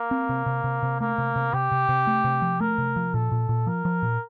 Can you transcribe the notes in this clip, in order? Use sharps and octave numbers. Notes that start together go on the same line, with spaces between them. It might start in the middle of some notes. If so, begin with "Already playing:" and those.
Already playing: A#3
C4
C3
C3
C3
C3
A3 A#3
C3
C3
C3 G4
C3
C3
A3
C3
F3
A3 A#4
C3
F3
A#2 A4
A#2
A#2
F3 A#4
F3
A#2